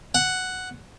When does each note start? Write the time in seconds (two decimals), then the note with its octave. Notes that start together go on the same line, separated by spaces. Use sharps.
0.15 F#5